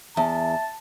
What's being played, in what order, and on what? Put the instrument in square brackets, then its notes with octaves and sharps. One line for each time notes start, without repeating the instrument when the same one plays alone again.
[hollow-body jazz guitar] E2 [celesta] E5 [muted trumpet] A5